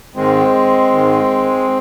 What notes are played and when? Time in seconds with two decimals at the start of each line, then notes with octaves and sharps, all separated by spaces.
0.16 G#2 D#3 G#3 C4
0.92 G#2 D#3